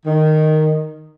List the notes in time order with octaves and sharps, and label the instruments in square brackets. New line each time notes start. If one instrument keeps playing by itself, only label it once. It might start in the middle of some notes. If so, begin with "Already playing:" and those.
[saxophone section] D#3